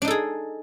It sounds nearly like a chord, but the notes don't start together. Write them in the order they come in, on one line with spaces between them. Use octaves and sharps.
D4 D#4 A4 G#4